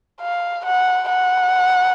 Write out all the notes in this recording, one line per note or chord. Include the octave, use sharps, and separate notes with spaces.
F5
F#5
F#5